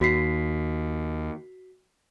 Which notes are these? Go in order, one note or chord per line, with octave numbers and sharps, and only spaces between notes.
D#2 F#4 B6 C7